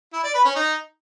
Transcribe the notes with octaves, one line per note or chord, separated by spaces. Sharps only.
E4
D5
B4
C#4
D#4